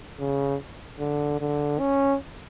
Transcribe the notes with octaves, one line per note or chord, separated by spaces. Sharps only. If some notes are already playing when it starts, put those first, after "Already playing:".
C#3
D3
D3
C#4